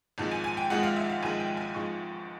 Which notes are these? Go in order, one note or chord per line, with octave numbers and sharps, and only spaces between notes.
G#1 G#2 F3 G#3 A5
G#5
G#5
G5
G#1 G#2 F3 G#3 F#5
F5
E5
F5
G#1 G#2 F3 G#3 G#5
G5
G#5
G#1 G#2 F3 G#3 C#6